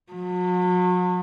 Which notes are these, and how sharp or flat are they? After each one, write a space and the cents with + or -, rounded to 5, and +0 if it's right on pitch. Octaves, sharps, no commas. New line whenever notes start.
F#3 -40